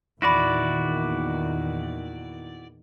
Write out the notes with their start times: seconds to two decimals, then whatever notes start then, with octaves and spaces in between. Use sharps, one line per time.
0.22 E2 A#2 D#3 E4 F#4 D5 B5 A#6